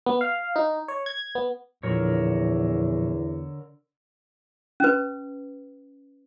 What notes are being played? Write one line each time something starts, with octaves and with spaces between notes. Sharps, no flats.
B3
F5
D#4
C#5
G#6
B3
E2 A#2 D3 F3 A#4 C#5 C#6
C#4 B4